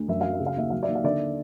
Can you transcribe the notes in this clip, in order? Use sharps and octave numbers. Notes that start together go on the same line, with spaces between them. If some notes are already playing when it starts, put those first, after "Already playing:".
Already playing: D2
F#2 E5
F#3 F5
E5
C#3
F5
D#2 E5
F#3 F5
D5 E5
D#2
F5
D3 D5 E5